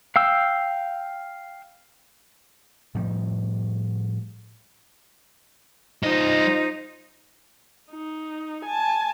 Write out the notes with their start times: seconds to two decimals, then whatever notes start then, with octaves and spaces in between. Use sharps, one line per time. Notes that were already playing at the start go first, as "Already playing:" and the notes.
0.16 F5 G5 E6
2.95 A2 F3 G3
6.03 G3 D#4 F4 C5 D#5
7.91 D#4
8.65 G#5 A5